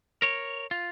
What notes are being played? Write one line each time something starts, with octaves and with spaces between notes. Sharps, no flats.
A#4 C#5
F4